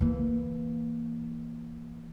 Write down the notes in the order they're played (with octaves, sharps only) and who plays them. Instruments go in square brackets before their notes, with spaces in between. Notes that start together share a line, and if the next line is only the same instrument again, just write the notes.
[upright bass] E3 A#3